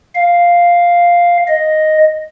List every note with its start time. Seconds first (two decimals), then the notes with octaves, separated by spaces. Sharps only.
0.15 F5
1.47 D#5